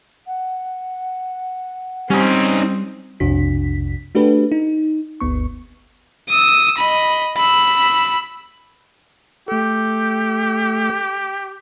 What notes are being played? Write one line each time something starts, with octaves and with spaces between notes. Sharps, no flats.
F#5
G3 C4 C#4 D#4
B1 F2 C3 D4 F#4 B6
A3 D4 F#4 G4 A4 B4
D#4
G1 D2 B3 C#6
D#6 E6
D#5 B5
B5 E6
A3 G4 A4